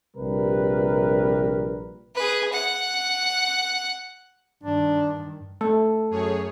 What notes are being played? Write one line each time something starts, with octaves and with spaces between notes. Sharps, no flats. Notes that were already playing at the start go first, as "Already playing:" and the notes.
A#1 C3 G3 A#4 B4
G#4 B4
F#5
G2 D#3 D4
A3 A4
F#2 G#4 C#5